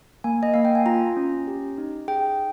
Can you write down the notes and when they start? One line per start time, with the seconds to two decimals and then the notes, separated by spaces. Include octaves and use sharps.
0.24 A#3 G#5
0.43 D#5
0.54 A#3 F5
0.65 G5
0.75 G#5
0.86 F4 A#5
1.17 C#4
1.47 G4
1.78 D#4
2.08 G#4 G5